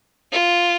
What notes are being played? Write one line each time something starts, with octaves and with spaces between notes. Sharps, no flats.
F4